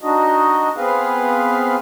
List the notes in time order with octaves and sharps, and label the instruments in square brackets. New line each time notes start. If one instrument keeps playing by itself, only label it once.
[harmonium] D4 D#4 F#4 D#5
B3 C4 G#4 B4 F5